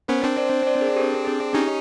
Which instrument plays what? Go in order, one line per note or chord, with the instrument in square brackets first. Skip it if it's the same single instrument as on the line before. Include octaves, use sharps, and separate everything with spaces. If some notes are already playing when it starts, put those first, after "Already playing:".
[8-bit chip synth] B3 C#4 [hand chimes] A#4 C5
[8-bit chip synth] C4 D4
[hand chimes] C5 D5
C5 D5
G#4 A#4
G4 A4
G#4
[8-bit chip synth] C#4 D#4 [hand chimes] G4